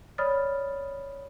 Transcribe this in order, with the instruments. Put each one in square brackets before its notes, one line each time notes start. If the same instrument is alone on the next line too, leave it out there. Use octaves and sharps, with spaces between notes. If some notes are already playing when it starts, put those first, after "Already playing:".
[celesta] C#5 D5 B5 D#6 F6 A6